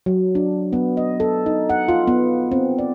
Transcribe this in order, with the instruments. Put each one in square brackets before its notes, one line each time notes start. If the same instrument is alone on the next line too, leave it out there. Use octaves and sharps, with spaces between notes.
[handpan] F#3
D4
B3
D#5
A4
D#4
F#5
F4
B3
C4
D5